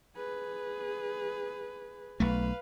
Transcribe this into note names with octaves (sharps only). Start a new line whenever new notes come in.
G#4 B4
B1 A3 B4 F5